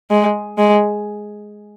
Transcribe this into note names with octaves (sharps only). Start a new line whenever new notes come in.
G#3
G#3